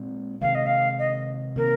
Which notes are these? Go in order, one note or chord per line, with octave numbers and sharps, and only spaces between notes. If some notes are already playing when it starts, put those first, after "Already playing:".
Already playing: A#2 G#3 C4
C3 D#3 G#3 F5
D#5
F5
D#5
C3 D#3 A#3 A#4